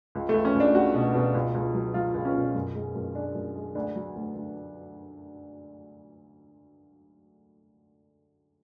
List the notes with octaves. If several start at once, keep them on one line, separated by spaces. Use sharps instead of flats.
C#2
A3
C#2
C#4
C#2
D4
C#2 F#4
B2
B2
C#2
C#2
F#3
F#3 F4
C#2
C#4
B2
F#2
G#3
F#2
G#3 D4
F#2
G#3
D2 D4
F#3
D2
D2